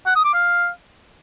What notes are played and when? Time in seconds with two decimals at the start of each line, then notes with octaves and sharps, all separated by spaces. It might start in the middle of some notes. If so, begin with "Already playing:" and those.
0.07 F#5
0.16 D#6
0.25 D6
0.34 F5